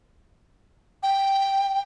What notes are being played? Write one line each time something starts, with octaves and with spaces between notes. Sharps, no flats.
G5